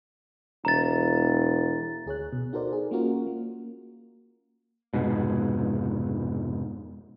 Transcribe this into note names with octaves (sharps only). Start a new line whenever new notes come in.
E1 A#5 A6
D2 G#4 C#5 F#6
B2
D#4 F#4 A4 A#4 C5 D5
G#4
A#3 C#4 F4 F#4 A#4
A#3
F1 G#2 B2